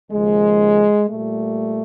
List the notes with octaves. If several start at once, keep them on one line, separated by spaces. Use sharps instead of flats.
D#2 C#3 F3 G#3
A#2 G3 A3